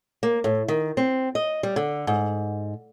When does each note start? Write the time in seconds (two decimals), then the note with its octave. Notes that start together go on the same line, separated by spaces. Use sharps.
0.23 A#3
0.44 A2
0.68 D#3
0.97 C4
1.35 D#5
1.63 G3
1.76 D3
2.07 G#2